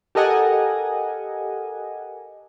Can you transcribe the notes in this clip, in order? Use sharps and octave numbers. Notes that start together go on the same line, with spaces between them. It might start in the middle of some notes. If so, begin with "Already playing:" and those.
G4 A4 A#4 D#5 F#5 G#5